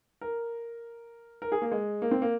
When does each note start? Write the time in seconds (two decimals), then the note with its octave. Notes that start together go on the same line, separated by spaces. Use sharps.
0.21 A#4
1.42 A#4
1.52 G#4
1.62 A#3
1.72 G#3
2.02 A#3
2.11 C4
2.22 A#3